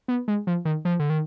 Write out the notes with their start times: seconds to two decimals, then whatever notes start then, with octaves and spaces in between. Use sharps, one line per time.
0.08 B3
0.28 G#3
0.47 F3
0.65 D#3
0.85 F3
0.99 D3
1.10 D#3